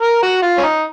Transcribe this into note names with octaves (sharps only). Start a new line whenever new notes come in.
A#4
F#4
F4
C#4
D#4